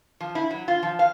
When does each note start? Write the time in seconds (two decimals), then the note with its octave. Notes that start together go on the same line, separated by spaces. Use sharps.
0.21 F3
0.35 E4
0.51 F#3
0.68 F4
0.83 F3
0.99 F5